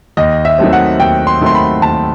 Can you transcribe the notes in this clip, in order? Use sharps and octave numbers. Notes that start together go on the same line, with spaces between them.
D#2 D#5
E5
D#3 F#3 A3 C4
F#5
D#2 G5
C6
D#3 F#3 A3 C4 C6
B5
D#2 A5